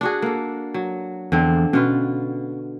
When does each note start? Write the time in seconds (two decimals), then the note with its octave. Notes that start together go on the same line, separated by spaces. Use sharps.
0.01 D4 F#4 G#4
0.22 A#3 A4
0.74 F#3
1.32 E2 D3 F3 C4
1.73 B2 C#4 F4 B4